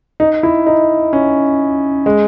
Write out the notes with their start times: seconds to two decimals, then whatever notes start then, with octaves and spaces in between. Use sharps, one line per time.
0.20 D#4
0.43 E4
0.67 D#4
1.13 C#4
2.06 G#3